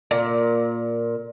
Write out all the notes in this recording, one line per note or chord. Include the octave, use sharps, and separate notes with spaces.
A#2